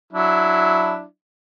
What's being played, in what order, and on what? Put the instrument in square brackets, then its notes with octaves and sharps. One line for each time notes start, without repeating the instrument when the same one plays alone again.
[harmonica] F#3 D4 E4